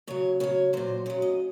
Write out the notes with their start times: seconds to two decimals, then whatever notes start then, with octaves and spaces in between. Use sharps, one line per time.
0.07 C#3 F#3 C#5
0.40 C#3 F#3 C#5
0.73 A#2 F#3 C5
1.06 C#3 F#3 C#5
1.22 D#5